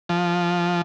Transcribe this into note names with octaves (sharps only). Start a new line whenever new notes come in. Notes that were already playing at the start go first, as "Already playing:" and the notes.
F3